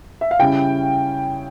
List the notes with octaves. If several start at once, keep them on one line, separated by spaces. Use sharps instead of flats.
E5
F5
C#3 G3 C#4 E4 G5